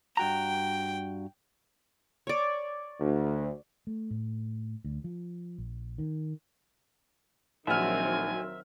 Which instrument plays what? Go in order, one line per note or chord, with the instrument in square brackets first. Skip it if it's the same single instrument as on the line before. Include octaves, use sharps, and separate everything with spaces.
[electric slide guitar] G2 F#4 A#5 [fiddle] G5
[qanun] C#5 D5
[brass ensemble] D2
[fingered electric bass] A3
A2
D2
F3
A#1
D#3
[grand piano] A#1 F#5 F6 [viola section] D#3 F#3 C4 [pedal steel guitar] E5 [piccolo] G#5